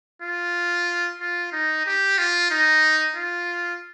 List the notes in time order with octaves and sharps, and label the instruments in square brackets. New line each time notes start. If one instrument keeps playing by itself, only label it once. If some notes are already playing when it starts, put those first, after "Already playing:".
[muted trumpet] F4
F4
D#4
G4
F4
D#4
F4